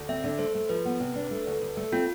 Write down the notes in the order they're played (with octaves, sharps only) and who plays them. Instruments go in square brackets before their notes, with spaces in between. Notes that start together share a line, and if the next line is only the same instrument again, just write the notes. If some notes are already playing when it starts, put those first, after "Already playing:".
Already playing: [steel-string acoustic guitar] D2
[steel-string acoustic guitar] C4 [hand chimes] E5
[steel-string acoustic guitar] D3
[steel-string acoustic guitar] A3 [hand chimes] C5
[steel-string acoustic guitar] A3
[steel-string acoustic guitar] F3 [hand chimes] B4
[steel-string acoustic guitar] B3
C3
D4
A3
D2
D2
A3
[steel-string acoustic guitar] C4 [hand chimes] F4